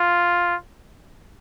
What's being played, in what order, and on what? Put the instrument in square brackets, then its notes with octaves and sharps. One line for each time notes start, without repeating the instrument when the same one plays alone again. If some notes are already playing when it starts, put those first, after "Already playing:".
Already playing: [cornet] F4